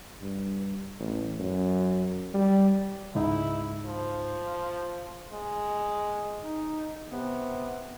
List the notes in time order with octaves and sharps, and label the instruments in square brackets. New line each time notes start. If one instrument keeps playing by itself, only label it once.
[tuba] G2
A1
F#2
G3
[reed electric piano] C#2 G#2 D#4 [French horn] E4
[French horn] F3
[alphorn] G#3
[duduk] D#4
[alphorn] C3 [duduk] B3